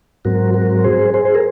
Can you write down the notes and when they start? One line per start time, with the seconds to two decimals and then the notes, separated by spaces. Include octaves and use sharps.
0.25 G#2 F#3 C4 F#4 A#4
0.54 F#4 A#4
0.84 G#4 C5
1.14 G#4 C5
1.25 C5
1.35 A#4